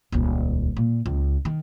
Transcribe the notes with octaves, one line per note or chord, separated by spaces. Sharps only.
D#1 C#2
A#2
C#2
D#3